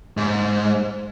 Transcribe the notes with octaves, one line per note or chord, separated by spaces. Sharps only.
G#2